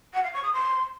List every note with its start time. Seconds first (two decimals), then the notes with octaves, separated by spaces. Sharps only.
0.13 F#5
0.23 F5
0.33 C#6
0.43 D#6
0.53 C6